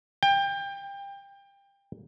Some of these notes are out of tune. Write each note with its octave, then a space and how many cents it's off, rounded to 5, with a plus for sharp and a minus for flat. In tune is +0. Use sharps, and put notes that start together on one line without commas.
G5 +25